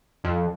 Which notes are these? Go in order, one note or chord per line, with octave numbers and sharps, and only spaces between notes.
F2